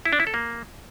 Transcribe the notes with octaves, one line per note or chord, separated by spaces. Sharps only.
E4
D4
E4
A4
A#3